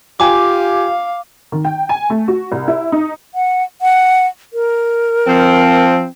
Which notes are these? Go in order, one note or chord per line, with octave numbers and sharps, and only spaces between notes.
F4 G4 F5 G5 G#5 D6
D#3
G5
G#5
A3
F#4
C2
E4
D#4
F#5
F#5
A#4
F3 C4